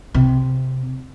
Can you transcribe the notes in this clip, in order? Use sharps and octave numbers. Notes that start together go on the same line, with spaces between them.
C3